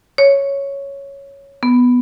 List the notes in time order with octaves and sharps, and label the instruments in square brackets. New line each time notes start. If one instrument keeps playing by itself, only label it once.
[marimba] C#5
B3